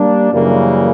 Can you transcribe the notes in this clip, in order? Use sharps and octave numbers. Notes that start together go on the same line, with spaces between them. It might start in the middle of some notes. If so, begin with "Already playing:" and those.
Already playing: G3 A#3 D4
F#2 C#3 E3 G3 A#3